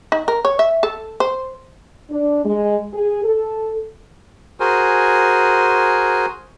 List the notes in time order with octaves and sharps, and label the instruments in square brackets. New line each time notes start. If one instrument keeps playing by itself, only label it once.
[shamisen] D#4
A#4
C#5
E5
A4
C5
[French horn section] D4
G#3
G#4
A4
[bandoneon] F#4 G#4 A#4 C5 G#5